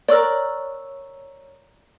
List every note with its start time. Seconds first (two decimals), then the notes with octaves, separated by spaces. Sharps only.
0.08 A#4 C#5 D5 C#6 E6